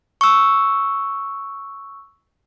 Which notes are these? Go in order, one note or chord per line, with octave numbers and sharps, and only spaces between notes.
C#6 E6